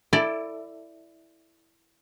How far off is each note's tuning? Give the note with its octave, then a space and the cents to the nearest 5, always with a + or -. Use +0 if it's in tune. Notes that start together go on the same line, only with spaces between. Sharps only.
E4 +0 A4 +20 D5 +0